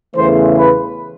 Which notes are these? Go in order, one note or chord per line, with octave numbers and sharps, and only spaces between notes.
E2 C#3 E3 A3 C5
B4